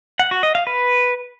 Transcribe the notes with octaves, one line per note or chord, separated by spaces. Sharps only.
F#5
F#4
D#5
F5
B4